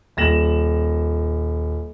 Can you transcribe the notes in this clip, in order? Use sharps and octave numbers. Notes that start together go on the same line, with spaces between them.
D#1 A#6 E7 F#7